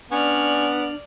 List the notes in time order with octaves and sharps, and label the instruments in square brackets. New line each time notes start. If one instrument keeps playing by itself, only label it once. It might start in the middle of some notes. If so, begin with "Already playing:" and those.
[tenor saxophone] B3 [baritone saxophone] C#4 [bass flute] D4 [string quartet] D5 F6